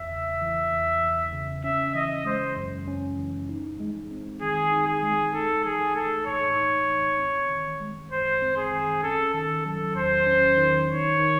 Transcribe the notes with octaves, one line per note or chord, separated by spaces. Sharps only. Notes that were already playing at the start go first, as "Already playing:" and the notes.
Already playing: E2 E5
C#3
E3
E2
E2
C#3
C#4 E5
E3 D#5
G#3 C5
F#2
C#4
E3
D#4
G#3
C4
D#3 G#4
D#4
G#4
G#3
D#4 A4
E3 G#4
A3 A4
A2 C#5
D#4
E3
C4
D#3
G#3
F#2 C5
C4
G#4
D#3
C#4 A4
D#3 A4
F#3 A4
E2 C5
C#4
D#3
D#4 C#5
D#3